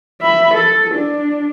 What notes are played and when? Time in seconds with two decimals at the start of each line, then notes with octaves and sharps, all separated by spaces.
0.22 E5 B5
0.54 A4
0.94 D4